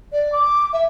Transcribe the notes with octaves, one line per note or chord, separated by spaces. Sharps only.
D5
D6
E5